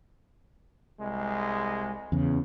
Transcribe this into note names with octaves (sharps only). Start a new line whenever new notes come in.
C2 G#3
E2 C#3